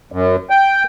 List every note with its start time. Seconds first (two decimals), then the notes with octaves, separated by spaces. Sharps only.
0.12 F#2
0.50 G5